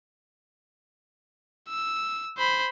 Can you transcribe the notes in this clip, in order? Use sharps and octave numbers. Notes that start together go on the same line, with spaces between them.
E6
C5 B5